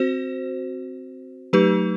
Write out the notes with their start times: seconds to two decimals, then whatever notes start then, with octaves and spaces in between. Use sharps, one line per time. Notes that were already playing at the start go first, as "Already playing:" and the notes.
Already playing: C4 F#4 C5
1.53 F#3 A3 D#4 G4 B4